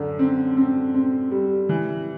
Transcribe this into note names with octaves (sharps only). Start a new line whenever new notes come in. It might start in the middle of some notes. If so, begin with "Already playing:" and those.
Already playing: F#2 D3
C4
C4
C4
G3
E3